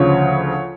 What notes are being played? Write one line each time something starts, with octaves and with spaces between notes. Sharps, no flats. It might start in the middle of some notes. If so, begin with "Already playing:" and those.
Already playing: D2 C#3 F3 C#5